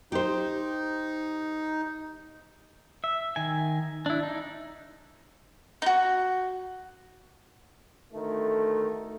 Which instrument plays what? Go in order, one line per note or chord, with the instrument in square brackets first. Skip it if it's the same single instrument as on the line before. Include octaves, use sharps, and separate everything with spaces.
[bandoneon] D#4 [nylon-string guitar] G4 C5
[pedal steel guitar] E5
D#3 G#5
D4 E4
D#4
[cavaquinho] D#4 F#4
[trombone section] D2 D#3 A3